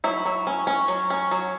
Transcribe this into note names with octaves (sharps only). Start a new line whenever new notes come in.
F#3 E4
F#3
C#4
C#4
F#3
C#4
F#3